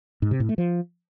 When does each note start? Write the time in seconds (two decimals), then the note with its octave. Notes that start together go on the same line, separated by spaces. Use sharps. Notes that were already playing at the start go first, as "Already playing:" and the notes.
0.22 G#2
0.31 C3
0.40 A2
0.49 A3
0.58 F3